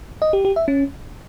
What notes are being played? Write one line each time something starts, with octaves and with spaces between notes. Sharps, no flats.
D#5
G4
G4
E5
C#4